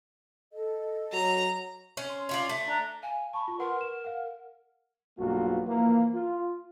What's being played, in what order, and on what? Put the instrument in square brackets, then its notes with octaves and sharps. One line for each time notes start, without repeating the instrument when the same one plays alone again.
[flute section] A4 D#5
[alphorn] F#3 [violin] A#5
[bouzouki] C#4
[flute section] C6
[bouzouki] C#4 F4 D5
A3
[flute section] D4 A#5
[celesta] F5 [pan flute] G#5
[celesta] A5 B5 [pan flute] C#6
[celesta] F4
[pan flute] A#4 [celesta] B4 F#5 C6
[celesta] E7
F5 F#5
[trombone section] B1 G2 A#3 F4 F#4
E3 F3 A#3
F4